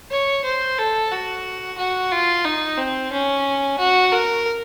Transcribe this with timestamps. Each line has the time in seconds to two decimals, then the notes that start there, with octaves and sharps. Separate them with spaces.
0.11 C#5
0.45 C5
0.78 A4
1.12 F#4
1.78 F#4
2.12 F4
2.45 D#4
2.78 C4
3.12 C#4
3.79 F#4
4.12 A#4